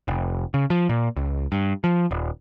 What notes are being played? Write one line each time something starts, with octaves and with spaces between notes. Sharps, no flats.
F1
C#3
F3
A#2
C#2
G2
F3
D#1